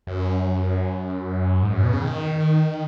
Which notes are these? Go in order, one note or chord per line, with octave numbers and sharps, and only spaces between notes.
F#2
G#2
F#2
B2
C#3
D#3